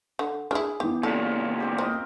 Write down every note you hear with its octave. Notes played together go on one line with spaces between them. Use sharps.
D3
D4 E4 G#4 F6
E3 B3 G4
A#2 C#3 A3 F4 A4 C#5
A#3 C4 G4
C4 A#4 D#5